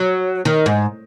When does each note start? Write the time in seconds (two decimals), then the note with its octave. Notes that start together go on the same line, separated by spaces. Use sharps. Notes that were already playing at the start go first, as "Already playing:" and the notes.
Already playing: F#3
0.45 D#3
0.66 G#2